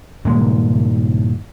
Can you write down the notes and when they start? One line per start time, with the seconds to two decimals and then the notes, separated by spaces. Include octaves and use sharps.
0.25 G2 A#2 D#3 G#3